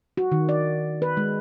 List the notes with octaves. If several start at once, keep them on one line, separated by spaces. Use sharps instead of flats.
F#4
D#3
D5
B4
G#3